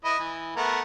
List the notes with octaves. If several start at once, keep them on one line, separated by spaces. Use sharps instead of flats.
E4 B4 D#5
E3
A3 B3 A#4